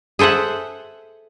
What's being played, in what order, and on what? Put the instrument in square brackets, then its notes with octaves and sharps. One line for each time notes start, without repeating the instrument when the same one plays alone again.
[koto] G#4 A4 C5 E5 F#5